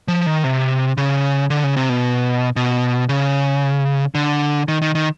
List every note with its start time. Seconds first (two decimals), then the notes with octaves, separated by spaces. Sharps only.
0.08 F3
0.26 D#3
0.44 C3
0.97 C#3
1.50 D3
1.64 C#3
1.77 C3
1.89 B2
2.56 B2
3.09 C#3
4.15 D3
4.68 D#3
4.82 D#3
4.95 D#3